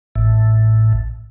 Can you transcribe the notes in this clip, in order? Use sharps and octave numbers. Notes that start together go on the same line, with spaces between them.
A1 A2